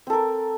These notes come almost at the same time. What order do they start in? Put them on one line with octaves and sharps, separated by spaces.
C4 A4 A#4